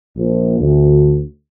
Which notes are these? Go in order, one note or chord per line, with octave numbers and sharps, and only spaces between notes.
A#1
D2